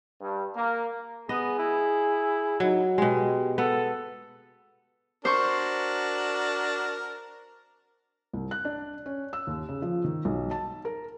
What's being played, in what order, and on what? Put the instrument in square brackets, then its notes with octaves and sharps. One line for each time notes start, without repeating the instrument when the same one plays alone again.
[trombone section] G2
A#3
[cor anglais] B3 [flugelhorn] G#4 [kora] D#5
[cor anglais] E4
[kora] F#3 [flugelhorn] D#4
[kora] B2 G#3 [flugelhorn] G4
[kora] B3 [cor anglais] A4
[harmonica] D4 F#4 A#4 [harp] C5 C#6
[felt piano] C2
F#6
D4
C#4
E6
D#2
C#3
F3
D#3
B1
A5
A#4